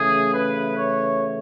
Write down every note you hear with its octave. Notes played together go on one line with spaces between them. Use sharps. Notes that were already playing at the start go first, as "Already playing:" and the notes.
Already playing: C#3 E3 A3 G#4
B4
C#5